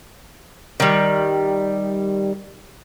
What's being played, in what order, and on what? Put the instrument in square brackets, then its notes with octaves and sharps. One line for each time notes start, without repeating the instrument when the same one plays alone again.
[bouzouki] D#3 G3